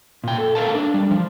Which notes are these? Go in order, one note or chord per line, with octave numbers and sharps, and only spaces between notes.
A#2 G5
A4
A4 A#4 F5 A5
D4
G3
F3